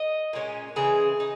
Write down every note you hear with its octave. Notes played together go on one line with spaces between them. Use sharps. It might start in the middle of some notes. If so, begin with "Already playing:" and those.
Already playing: D#5
A#2 G#3 C#4
C#3 E3 G#3 G#4
D#4